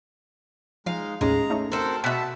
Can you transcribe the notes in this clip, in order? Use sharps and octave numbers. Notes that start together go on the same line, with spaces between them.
F3 G#3 D#4 F5
A1 D#2 G#3 C#4 A#5
A3 C#4 D#4
C4 F#4 A4 A#4 C5
B2 F#4 E5 F#5 A5